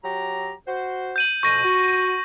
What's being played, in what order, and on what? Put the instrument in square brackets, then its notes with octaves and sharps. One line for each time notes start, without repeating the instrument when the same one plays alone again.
[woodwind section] F#3 G4 A#5
F#4 C5
[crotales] G6 D#7 F#7
[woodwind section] F2 B2 [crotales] C#6 A#6 D#7
[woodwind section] F#4